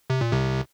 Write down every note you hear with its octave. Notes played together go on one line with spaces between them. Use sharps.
C3
A#2
C2 C3